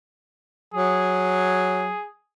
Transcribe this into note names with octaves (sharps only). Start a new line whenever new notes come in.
F#3 G#4